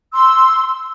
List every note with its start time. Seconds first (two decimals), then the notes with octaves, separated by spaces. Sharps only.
0.14 C6 E6